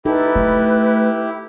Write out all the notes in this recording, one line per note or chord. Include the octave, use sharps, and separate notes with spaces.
D#4 E4 G4 A4 B4
A3